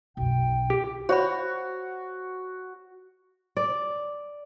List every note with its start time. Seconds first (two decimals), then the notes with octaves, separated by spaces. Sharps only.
0.17 B1 F#2 G5
0.70 G4
1.09 F#4 C5 C#5 B5
3.57 D5